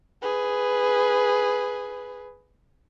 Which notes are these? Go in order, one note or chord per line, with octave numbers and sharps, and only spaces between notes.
G#4 B4